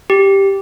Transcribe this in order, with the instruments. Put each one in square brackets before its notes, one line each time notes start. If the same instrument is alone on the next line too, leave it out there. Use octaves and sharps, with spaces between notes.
[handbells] G4